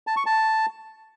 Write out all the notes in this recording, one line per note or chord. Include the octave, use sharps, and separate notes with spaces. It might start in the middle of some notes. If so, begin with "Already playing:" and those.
A5
C#6
A5